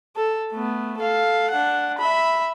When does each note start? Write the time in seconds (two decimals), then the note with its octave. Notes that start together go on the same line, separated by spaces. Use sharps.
0.17 A4
0.52 A3 B3
0.98 A4 F5
1.51 D4 F#5
1.98 E5 B5